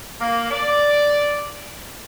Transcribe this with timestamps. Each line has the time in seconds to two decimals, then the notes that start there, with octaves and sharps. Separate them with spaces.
0.21 A#3
0.51 D5